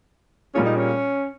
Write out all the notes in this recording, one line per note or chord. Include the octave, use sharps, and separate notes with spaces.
A#2 G3 A#3 C#4 F4 G#4
D#4
C#4